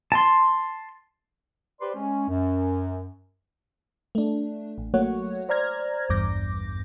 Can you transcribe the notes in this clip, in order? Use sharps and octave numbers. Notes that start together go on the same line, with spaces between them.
A5 C6
G4 B4 C5 D5 C6
G#3 C#4
F#2
A3 D4
A1
F#3 A3 A#3 F#4 C#5 F#5
C5 D5 A#5 F6 G#6 A#6
A1 E2 G2 D6 G6 A#6